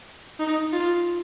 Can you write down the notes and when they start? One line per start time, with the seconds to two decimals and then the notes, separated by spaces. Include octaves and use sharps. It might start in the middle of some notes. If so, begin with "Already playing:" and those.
0.39 D#4
0.72 F4